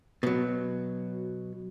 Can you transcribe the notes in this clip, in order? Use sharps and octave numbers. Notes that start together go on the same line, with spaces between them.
B2 F#3